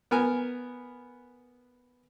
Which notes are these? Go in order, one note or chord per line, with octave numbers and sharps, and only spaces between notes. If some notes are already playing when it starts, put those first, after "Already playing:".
B3 A#4 G#5